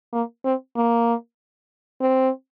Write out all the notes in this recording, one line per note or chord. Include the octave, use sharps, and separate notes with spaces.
A#3
C4
A#3
C4